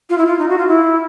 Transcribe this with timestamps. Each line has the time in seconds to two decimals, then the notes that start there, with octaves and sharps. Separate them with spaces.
0.10 F4
0.18 E4
0.27 F4
0.39 D#4
0.49 F#4
0.58 F4
0.68 E4